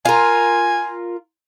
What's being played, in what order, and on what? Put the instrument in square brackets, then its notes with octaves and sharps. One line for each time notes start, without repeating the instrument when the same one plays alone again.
[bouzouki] F4 A#4 [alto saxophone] G#5